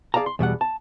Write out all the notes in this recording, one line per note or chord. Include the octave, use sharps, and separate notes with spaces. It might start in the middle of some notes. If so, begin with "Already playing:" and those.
G#4 D5 F5 A5 A#5
C6
E2 B2 G3 F#5
A5